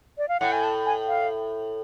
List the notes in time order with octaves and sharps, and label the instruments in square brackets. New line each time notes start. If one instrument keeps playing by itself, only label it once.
[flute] D5
F5
[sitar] A2 [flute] F#5
[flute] G#5
A5
G#5
F5